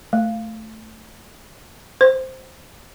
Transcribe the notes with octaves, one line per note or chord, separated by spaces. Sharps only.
A3
C5